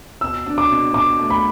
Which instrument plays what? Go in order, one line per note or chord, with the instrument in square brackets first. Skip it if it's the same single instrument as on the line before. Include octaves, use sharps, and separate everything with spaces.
[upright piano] B2 [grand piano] E6
[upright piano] D4
[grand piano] D6
[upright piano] B2
[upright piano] B2 [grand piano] D6
[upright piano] A3
[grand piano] B5